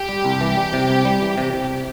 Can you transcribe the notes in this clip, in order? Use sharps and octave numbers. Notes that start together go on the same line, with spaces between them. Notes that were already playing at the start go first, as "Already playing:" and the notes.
Already playing: G4
G3
C2
E3
G3
C3
C2
G3
E3
C3
C3